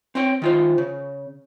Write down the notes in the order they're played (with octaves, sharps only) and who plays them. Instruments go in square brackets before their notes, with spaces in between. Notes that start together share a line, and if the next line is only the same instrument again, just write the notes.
[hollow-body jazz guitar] C4 C#5 G5
D#3 F4 C5
C#3